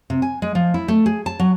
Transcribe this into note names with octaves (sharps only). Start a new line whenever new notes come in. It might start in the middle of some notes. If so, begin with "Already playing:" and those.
C3
G#5
G#3
F3
E4
A3
G#4
A5
F#3